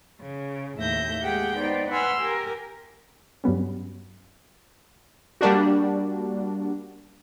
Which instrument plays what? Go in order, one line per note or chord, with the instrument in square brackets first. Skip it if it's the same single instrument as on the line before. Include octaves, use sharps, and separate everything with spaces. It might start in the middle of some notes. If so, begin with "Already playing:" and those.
[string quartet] C#3
D#2 A2 E5 G6 A#6
G#3 A#3 G4 G#4 F#5 G5
B3 D#4 C5 D5
B4 F#5 G#5 C6 E6 F6
G4 A#4 G#5
[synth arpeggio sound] G2 F#3 B3 C#4
[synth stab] G3 A#3 D4 F#4